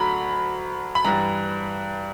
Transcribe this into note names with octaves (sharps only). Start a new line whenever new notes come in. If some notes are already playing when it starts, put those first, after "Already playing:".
Already playing: D2 D3 F#3 A#5 B5
B5
G2 E3 G3 A#5